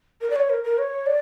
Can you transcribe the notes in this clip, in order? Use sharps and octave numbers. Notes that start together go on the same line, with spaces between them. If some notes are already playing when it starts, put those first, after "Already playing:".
A#4
D5
C#5
A#4
A#4
C#5
D5